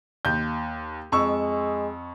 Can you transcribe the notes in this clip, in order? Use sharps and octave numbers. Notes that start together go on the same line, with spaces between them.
D#2 G6
F2 G#3 C#6 E6